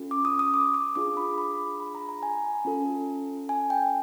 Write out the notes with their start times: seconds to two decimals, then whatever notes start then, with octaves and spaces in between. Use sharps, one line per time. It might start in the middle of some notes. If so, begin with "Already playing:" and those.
Already playing: C#4 F4 A4
0.11 D6
0.25 D#6
0.39 D#6
0.54 D6
0.74 D6
0.95 D4 F4 G#4 D6
1.17 B5
1.38 B5
1.80 B5
1.95 A#5
2.09 A#5
2.23 G#5
2.65 C#4 F4 A4
3.49 G#5
3.70 G5